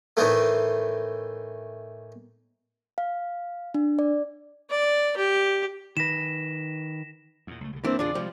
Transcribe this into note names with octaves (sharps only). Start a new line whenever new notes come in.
A2 D#3 E3 A3
F5
D4
D5
D5
G4
D#3 B4 A#6 B6 E7
E2 A#2
C#2 A3
C2 D3
G2 E3 A#3 C4 D4
E2 A#2 C#3 D4 F4 G#4 D5
C3 D#3 F3 G3 G#3